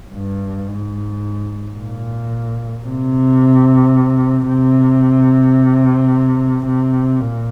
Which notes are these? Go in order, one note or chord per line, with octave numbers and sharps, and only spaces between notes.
G2
G#2
A#2
C3
C3
C3
A#2